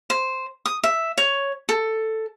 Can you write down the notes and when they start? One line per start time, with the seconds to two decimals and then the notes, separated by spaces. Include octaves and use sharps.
0.10 C5
0.66 D#6
0.84 E5
1.18 C#5
1.69 A4